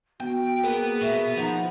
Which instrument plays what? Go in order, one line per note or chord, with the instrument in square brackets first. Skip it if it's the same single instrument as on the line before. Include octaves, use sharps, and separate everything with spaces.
[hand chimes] B3 [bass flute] F#4 [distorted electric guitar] G5
[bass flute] A#3 [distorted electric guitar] B3 [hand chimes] G#4 A#4
[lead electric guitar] B2 [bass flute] E5
[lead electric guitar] F3 [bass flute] D#4 [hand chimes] F#5 A#5